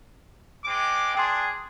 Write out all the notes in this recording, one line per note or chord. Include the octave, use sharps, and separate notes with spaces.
G#3 C4 D6
D4 G#4 G5 C6